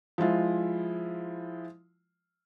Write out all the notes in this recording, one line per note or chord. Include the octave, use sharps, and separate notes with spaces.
F3 G#3 E4 F4